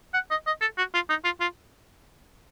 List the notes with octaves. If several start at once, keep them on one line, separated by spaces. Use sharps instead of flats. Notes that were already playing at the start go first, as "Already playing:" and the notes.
F#5
D#5
D#5
A4
F#4
F4
D#4
F4
F4